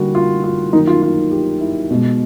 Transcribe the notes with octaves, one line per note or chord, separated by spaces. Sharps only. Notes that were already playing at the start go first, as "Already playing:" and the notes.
Already playing: D3 G3 A#3 F#4
F4
F4
D#3 F#3 A#3 D#4
F4
F4
G4
E4
B2 G#3